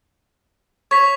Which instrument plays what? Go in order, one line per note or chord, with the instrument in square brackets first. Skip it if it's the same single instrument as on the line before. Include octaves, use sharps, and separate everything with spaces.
[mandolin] C#5 [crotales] C#6 B6 F7